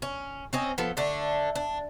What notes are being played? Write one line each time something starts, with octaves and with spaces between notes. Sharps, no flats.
C#4
C4 C#4 D#5
F3 B3 A4
D3 A3 D4
D4